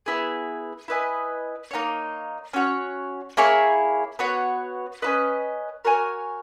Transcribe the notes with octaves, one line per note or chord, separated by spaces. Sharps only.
B3 E4 G#4
E4 B4 D#5 G#5
A#3 D#4 F#4 C#5
C#4 F#4 C#5
A#3 E4 G#4 C#5
B3 F#4 C#5
C#4 E4 B4 D#5
F#4 A#4 C#5 G#5